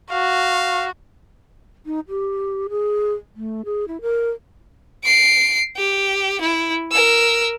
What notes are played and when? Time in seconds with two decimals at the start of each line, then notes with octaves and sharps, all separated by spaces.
0.11 F#4 F5
1.86 D#4
2.09 G4
2.69 G#4
3.36 A3
3.65 G#4
3.88 E4
4.01 A#4
5.04 C7 D7
5.76 G4
6.41 E4
6.91 A#4 E6